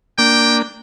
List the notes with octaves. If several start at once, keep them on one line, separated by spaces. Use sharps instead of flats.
A#3 D4 G5